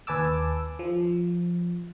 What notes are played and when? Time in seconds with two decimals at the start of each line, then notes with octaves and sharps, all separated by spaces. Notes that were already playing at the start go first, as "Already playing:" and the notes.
0.07 D#2 B4 G#5 A5 D6 E6
0.79 F3